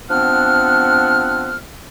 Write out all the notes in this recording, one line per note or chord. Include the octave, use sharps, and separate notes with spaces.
F3 B3 C4 D4 F#5 F6